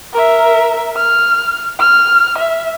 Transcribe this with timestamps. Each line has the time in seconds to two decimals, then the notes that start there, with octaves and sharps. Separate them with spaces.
0.13 A#4 E5
0.97 F6
1.80 F6
2.38 E5